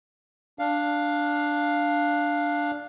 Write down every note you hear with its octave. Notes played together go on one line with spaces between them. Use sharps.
D4 F5